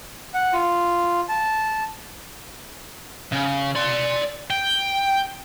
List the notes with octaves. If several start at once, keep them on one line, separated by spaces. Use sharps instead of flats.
F#5
F4
A5
C#3
D5 C6
G5